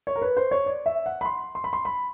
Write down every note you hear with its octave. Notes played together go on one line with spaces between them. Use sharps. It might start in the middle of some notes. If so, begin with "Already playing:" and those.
C#5
A#4
B4
C5
C#5
D5
E5
F#5
B5
C6
C6
B5
C6
B5